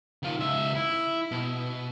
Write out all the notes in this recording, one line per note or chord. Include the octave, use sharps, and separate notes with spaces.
D#3 F4
C#2 E5
E4
B2